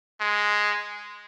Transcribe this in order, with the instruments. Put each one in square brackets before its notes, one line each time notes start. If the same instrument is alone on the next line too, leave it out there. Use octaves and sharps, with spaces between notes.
[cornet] G#3